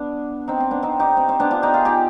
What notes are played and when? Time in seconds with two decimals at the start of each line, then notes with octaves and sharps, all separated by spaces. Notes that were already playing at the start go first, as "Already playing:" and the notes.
Already playing: B3 D4
0.48 C4 D#4
0.60 C4
0.71 B3 D4
0.83 C4 D#4
0.99 D#4 G4
1.17 C4
1.29 C4
1.40 B3 D4
1.51 D4 F4
1.62 D#4 G4
1.74 F4 G#4
1.85 D#4 G4